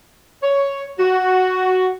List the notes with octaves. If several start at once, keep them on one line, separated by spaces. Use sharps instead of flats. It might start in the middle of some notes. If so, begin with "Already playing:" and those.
C#5
F#4